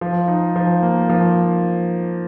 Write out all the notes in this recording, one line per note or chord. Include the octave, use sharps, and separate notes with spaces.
F3
D#4
F3
A#3
F3